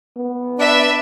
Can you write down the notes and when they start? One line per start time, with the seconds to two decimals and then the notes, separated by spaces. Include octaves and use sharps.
0.17 B3
0.58 D4 B4 E5